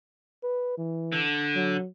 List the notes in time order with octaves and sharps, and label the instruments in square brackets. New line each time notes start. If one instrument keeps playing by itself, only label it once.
[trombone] B4
E3
[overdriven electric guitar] D3
[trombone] F#3